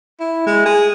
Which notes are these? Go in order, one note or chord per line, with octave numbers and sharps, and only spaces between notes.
E4
G#3
G#4